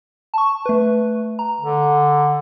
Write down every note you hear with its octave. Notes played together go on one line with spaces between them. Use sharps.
A5 C#6
A3 B4
A#5
D3